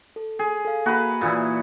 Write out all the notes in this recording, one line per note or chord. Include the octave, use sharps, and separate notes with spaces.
A4
G#4
A4 F5
A#3 F#4 B4 A#5 B5
A#2 E3 E4 D5 D#6